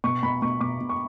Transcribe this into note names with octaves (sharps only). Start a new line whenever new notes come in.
B2 C#6
B2 B5
B2 C#6
B2 D6
B2
C#6